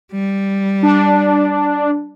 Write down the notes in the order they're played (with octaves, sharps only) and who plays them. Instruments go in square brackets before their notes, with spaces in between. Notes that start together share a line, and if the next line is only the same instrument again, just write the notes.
[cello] G3
[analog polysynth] D4